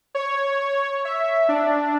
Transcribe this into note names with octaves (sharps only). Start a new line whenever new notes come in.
C#5
E5
D4